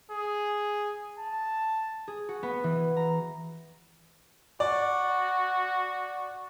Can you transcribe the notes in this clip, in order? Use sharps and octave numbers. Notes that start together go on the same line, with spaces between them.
G#4
A5
G#4
F#4
B3
E3
A#5
F#4 D5